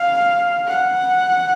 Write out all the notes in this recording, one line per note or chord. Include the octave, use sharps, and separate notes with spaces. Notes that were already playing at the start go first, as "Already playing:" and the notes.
Already playing: F5
F#5